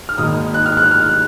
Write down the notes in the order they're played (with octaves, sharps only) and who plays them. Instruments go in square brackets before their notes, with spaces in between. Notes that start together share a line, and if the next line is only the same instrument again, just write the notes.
[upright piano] F6
G#1 G#2 D#3 A#3 D#6
F#6
F6
F#6
F6